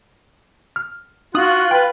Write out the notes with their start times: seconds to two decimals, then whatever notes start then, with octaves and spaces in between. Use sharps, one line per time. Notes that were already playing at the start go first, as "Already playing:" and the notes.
0.76 F6
1.35 D#4 F4 F#4 D#6 F#6
1.71 B4 G5